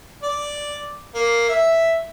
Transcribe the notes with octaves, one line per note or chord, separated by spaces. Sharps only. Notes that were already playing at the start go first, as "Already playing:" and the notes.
D5
A#3
E5